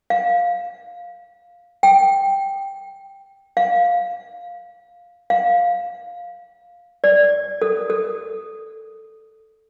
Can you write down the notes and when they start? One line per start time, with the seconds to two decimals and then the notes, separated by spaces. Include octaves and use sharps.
0.10 F5
1.83 G5
3.57 F5
5.30 F5
7.04 D5
7.62 A4
7.90 A4